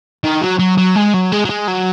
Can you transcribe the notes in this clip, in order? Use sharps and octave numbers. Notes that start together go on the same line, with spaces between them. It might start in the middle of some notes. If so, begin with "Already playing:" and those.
D#3
F#3
F#3
F#3
G#3
F#3
G#3
F#3
G#3
F#3